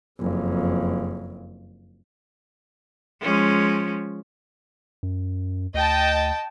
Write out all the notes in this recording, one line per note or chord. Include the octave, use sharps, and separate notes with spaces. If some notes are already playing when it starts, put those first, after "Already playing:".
F#1 F2
F3 G#3 C#4
F#2
D2 D#5 G5 A5